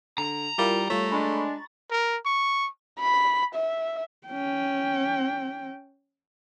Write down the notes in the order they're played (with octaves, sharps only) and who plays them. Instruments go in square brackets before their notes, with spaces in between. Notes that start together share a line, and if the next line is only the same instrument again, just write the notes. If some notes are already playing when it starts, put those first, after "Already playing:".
[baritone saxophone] D3 [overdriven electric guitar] A#5
[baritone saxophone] G3 [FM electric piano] E4 F4 A#4
[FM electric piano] G3 F4 C#5 [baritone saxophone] A3
[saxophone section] G#3 D4 [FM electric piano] B5 C#6 A6
[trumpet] A#4
C#6
[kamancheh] B5
E5
[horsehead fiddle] C#4 G5